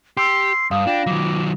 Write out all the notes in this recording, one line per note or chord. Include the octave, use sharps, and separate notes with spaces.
G4 C6 E6 C7
G2 F5 D#6
D4 F4 G5 A#6
D#3 F#3 D6